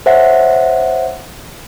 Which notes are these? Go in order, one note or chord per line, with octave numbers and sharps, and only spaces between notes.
C5 C#5 E5 F#5